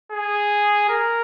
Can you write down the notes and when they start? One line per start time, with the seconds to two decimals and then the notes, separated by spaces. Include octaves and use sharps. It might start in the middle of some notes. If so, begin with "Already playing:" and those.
0.12 G#4
0.90 A#4